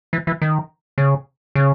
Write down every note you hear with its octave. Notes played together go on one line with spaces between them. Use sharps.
E3
E3
D#3
C#3
C#3